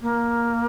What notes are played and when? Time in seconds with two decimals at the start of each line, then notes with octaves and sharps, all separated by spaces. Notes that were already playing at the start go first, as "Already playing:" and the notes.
0.02 A#3